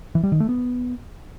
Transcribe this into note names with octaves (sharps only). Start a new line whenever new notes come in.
E3
G3
D#3
A3
B3